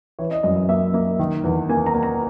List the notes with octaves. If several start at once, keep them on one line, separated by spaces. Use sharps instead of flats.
E3 C#5
D#5
F#2 D#5
D#5
A#3 E5
A#3
D#3
E2
A#3 G#5
A#5
A#3
A#5